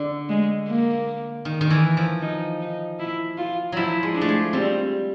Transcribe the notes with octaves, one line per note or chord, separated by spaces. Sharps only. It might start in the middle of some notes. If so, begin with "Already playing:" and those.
Already playing: D3
G#3
A#3
D#3
D#3
E3
F3
D#4
D#4
E4
F4
F3 F#3 E4
G#3
D4
A3
G#3
G3 C4